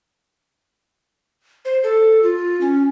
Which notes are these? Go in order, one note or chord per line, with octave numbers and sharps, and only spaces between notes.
C5
A4
F4
C#4